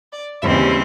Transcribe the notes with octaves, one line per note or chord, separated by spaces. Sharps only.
D5
D#2 C#3 E3 G3 C4 E5